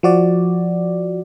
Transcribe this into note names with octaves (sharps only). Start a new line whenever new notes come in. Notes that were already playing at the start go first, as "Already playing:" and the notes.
F3 F#4 D5